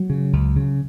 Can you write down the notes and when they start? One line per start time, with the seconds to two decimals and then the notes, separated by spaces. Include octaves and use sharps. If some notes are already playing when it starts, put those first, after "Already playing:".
Already playing: F#3
0.10 C#3
0.33 C#2
0.56 C#3